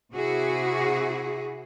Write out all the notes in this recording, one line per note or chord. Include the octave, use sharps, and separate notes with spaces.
C3 E4 F#4 G#4